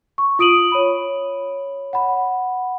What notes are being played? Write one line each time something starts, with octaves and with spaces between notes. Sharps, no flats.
C#6
F4 D#6 D7 D#7 F#7
C#5 B5
F#5 B5